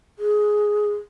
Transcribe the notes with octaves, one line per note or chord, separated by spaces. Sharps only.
G#4